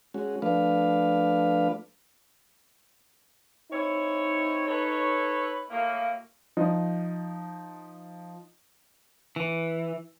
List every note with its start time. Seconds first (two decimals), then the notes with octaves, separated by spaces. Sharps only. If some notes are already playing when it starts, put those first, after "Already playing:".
0.14 G#3 C#4 F#4
0.42 F3 A3 D4 B4 F5
3.71 C4 D#4 E4 C#5
4.66 A4 B4 C#5
5.70 A2 F#3 A#3
6.57 F3 D#4
9.36 E3